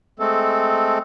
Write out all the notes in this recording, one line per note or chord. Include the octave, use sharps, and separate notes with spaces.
G#3 A3 C4 A4